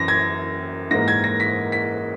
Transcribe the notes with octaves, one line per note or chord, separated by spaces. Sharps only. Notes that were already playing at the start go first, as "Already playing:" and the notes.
Already playing: F#2 E3 A#6
G#6
G#2 E3 A#3 A#6
G#6
A#6
B6
B6